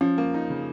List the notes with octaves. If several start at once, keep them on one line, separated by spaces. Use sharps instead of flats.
F3 C#4
A#3
D#4
C#3